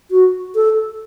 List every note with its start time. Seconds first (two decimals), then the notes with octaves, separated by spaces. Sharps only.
0.11 F#4
0.55 A4